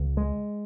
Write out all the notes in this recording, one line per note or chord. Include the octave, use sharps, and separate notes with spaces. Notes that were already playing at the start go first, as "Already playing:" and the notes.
Already playing: C#2
G#3